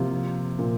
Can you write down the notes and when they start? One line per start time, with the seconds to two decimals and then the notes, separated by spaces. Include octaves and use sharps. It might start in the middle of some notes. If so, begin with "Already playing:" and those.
Already playing: C3 F3 A#3 F4
0.59 A#2